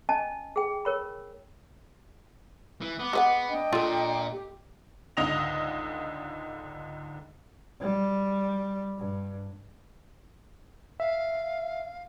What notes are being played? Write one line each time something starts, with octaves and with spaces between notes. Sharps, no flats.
C#4 D#5 G#5 A5
G#4 G5
A#4 C#5 B5
E3
B3 D6
G#3 B3 B4 F#5
D4 D#5 G5
A#2 F4 A4
G4
C#2 G#2 D3 D#5 A#6 F7
G3
G2
E5 F5